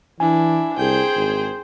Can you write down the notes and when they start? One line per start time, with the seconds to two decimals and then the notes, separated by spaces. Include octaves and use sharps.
0.20 E3 D4 E4 G#5
0.78 C2 G#4 C5 G5
1.16 G#1